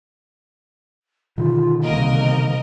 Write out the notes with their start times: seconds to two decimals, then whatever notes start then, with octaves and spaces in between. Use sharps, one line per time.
1.38 B2 D3 D#3 F4
1.82 C2 A#3 A#4 D#5